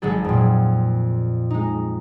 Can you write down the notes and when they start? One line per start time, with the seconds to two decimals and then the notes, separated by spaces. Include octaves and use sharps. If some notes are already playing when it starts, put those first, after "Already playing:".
0.02 G#1 F#3 G#3 G#4 A4
0.25 F2 A#2
1.50 G#3 D#4